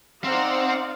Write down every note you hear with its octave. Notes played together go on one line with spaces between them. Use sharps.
C4 D#4 C5 D5 F5 F#5 A#5